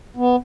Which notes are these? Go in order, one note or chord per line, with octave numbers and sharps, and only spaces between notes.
B3